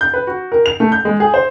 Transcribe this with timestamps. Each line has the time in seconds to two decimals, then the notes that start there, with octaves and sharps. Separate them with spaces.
0.01 G6
0.14 B4
0.27 F#4
0.52 A#4
0.66 F7
0.80 A3
0.92 G6
1.05 G#3
1.20 G#4
1.34 C5